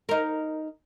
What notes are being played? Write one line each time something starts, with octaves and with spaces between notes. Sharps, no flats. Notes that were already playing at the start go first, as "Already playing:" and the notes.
D#4 A#4